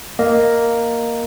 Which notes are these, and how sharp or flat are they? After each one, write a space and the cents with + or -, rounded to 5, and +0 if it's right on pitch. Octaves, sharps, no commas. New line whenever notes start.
A#3 +0 D#5 +0